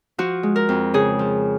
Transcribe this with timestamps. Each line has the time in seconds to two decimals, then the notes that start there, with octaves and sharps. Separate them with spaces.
0.18 F3 F#4
0.43 G#3
0.56 A#4
0.69 F2
0.94 C#3 G#4
1.19 F3